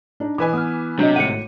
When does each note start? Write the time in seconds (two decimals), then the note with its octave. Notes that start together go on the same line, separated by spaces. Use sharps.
0.20 D4 D#4
0.38 E3 B4 D#5 G#5 B5 D6
0.53 B3 D#6 F6
0.99 C3 F#3 D4 D#5
1.16 G#1 A2 F#5 C#7 D#7